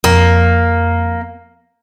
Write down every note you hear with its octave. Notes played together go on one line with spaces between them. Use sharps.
F2 A#3